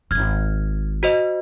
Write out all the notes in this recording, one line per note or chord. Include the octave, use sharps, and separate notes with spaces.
D#1 G#1 F6 G#6
F#4 C5 D#5